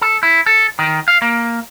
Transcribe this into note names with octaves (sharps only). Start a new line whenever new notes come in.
A4
E4
A4
D#3
F5
A#3